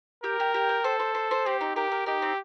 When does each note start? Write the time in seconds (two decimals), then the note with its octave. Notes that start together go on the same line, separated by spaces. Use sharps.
0.23 G4 A#4
0.40 G4
0.54 G4
0.69 G5
0.84 A4 C5
0.99 C5
1.15 C5
1.31 C5
1.46 C4 G4
1.61 D#4
1.76 G4 A#4
1.92 A#4
2.06 D#4 G4
2.22 C4